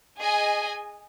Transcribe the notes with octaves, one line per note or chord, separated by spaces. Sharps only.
G#4 D#5 G#5